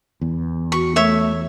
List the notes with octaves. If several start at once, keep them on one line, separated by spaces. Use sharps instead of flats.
E2
F#4 C#6
A3 C#5 E5